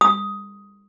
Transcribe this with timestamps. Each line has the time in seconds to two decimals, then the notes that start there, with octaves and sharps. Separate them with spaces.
0.01 D#6